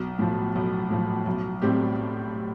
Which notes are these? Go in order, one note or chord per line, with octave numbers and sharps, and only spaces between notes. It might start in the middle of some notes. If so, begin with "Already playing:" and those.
Already playing: B1
A2 F3
B1
A2 F3
B1
A2 G3 C4 G4